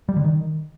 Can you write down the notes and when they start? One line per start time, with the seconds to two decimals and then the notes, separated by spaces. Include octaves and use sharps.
0.09 G3
0.16 D3
0.24 D#3